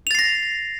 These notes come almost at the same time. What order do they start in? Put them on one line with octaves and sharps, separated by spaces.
F7 A6 C7 A#6